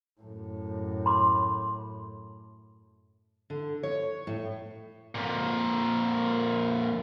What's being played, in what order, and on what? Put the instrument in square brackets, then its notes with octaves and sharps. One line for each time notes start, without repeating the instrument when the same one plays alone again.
[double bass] F#2 A2
[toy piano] B5 C6 D6
[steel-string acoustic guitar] D3
C#5
A2
[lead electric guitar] F2 A#2